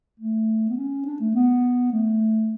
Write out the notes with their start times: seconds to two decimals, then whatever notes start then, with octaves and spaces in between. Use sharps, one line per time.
0.20 A3
0.69 B3
0.77 C#4
1.06 D4
1.20 A3
1.35 B3
1.92 A3